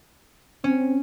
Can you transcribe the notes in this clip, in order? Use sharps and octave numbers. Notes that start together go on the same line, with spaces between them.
C4 C#4